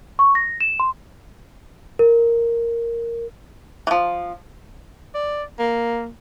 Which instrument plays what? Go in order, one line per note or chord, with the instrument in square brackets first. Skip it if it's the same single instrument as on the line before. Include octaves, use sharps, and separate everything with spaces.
[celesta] C#6
A#6
E7
C6
A#4
[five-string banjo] E3 F3
[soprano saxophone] D5
A#3